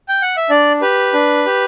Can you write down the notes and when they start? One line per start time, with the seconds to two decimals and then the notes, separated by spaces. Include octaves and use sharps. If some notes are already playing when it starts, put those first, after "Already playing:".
0.09 G5
0.22 F#5
0.37 E5
0.50 D4 D5
0.82 G4 B4
1.14 D4
1.46 G4